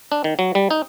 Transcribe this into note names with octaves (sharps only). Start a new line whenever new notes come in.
D4
D#3
F#3
G3
D#4